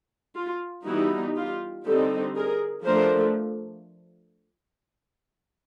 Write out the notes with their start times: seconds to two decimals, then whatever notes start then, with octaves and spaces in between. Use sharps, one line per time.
0.36 F4
0.86 E3 G3 B3 D#4 E4 F#4
1.36 F4 G4
1.86 D3 G3 C4 D#4 G4 A4
2.36 G#4 A#4
2.86 F3 A3 D4 A#4 C5